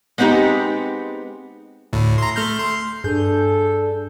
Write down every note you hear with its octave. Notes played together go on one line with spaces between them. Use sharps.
G#3 B3 C4 D#4 G4
D2 A2
A#5 C6
A3 F6 G6
C6
G2 D4 G#4 A4 G6